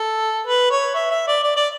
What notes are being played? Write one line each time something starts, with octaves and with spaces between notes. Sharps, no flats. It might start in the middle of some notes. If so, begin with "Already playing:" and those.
Already playing: A4
B4
C#5
E5
E5
D5
D5
D5